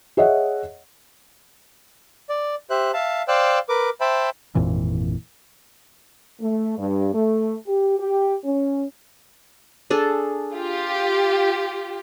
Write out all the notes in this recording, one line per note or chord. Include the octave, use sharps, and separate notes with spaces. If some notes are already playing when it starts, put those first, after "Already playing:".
G#4 C#5 D#5 E5 F#5
D5
G4 C5 E5 F#6
E5 F5 A5
C5 D5 F5 G5 E6 F#6
A#4 B4 D6
C5 E5 G5 A5 B5
G#1 F2 A#2 E3
A3
G2
A3
G4
G4
C#4
D4 G#4 A4
F4 G4